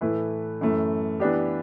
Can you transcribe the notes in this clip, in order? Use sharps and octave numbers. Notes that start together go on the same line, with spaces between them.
A2 E3 A3 E4 B4
F#2 E3 A3
E3 B3 D4 G4